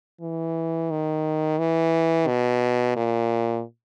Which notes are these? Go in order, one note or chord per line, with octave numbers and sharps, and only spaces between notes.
E3
D#3
E3
B2
A#2